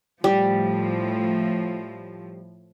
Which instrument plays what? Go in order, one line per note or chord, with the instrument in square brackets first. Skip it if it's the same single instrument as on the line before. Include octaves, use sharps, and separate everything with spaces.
[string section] A2 F3 [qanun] G3